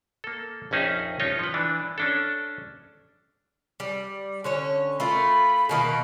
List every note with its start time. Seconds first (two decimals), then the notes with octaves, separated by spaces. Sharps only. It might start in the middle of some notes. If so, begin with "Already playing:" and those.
0.24 A#3 A4
0.71 A#1 F2 C#4 D#4 G#4 E5
1.20 C#4 D#4 F4 C#5 D#5
1.39 F3 B4
1.54 E3 D4
1.98 C#4 D4 A4
3.80 G3
4.44 D3 C#4 C#5
5.00 A3 F4 A#4 B5
5.69 B2 D#3 A#3